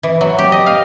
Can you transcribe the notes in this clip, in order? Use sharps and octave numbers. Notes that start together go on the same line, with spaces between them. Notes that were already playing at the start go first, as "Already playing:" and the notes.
E3
F#3
G4
D#5
F5